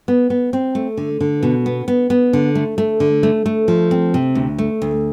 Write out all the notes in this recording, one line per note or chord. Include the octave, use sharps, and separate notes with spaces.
B3
B3
C4
A3
D3
D3
B2
B3
B3
B3
D3
A3
A3
D3
A3
A3
F3
C4
C3
D2
A3
D2